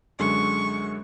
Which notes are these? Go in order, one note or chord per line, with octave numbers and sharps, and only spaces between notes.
F#2 D3 G#3 C#6